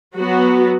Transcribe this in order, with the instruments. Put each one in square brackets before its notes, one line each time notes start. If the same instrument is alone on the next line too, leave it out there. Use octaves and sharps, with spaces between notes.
[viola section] F#3 B3 F#4